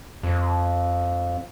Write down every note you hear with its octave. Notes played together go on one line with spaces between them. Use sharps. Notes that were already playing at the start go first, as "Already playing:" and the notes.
F2